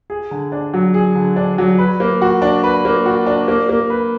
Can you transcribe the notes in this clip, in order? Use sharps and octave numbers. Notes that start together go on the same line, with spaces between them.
G#4
D3
D4
F#3
G#4
D3
D4
F#3
B4
A#3
F#4
D4
B4
A#3
F#4
D4
A#3
A#3
B4